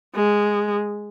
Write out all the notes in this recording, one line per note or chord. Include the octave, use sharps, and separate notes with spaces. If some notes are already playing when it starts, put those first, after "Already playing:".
G#3